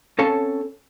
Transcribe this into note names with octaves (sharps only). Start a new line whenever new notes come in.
C4 C#4 A4 C#5 F5 A5